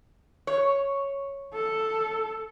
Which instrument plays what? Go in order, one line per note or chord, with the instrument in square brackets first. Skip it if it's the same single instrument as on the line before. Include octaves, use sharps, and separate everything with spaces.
[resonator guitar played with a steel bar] C#5
[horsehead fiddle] A4